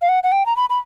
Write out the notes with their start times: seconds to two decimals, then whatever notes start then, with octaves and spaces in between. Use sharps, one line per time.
0.02 F5
0.09 F#5
0.23 F#5
0.32 G5
0.46 A#5
0.56 B5
0.70 B5